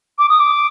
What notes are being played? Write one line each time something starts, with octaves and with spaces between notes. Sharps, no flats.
D6
D#6
D6